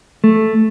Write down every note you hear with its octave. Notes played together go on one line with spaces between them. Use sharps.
A3